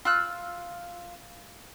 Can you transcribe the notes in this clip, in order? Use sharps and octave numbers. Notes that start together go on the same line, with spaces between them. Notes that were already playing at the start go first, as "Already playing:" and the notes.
F4 E6 F#6